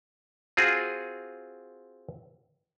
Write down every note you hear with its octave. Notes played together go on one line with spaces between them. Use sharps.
C4 F4 F#4 G#4